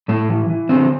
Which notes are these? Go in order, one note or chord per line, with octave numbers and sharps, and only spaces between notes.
A2 A3
E3
E3
D3 C4